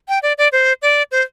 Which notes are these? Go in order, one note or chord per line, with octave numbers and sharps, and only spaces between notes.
G5
D5
D5
C5
D5
C5